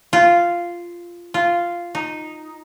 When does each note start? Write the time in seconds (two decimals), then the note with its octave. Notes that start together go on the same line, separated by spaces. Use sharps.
0.13 F4
1.34 F4
1.95 D#4